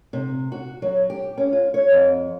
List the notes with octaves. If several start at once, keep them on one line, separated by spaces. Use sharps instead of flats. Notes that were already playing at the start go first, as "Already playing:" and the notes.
C3
F#4
F#3
G4
C#4
F4
C#5
F2